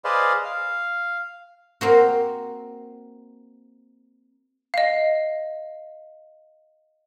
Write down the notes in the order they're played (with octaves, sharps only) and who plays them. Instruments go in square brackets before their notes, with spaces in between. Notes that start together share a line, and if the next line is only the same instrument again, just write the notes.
[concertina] G#4 B4 C5 D5 D#5 F5
F5
[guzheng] A#3 C4 F#4
[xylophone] D#5 F5